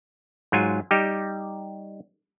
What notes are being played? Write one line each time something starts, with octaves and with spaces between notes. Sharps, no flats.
G#2 F#3 F4 G#5
G3 D#4 G4